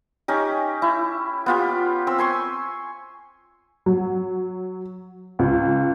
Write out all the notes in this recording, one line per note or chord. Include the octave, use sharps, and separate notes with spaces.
C#4 D#4 G4
E4
B3 F4 G4
C4 E6
G#5 C6 C#6
F#3
C#2